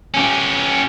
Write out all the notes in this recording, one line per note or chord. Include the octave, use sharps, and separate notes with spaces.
C#4 G4